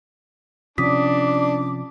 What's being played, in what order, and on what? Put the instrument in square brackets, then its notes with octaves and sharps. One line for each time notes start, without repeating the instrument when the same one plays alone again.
[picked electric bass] C3 F3 [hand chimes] C#4 D#6 B6 [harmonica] D4 [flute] D6